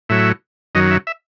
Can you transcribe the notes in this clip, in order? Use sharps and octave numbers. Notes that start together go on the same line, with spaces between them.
A2 F#3 E5
F#2 D#3 F#3 D#5
E5
E5